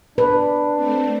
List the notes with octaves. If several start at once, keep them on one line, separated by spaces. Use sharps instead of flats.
D4 B4
A3 C4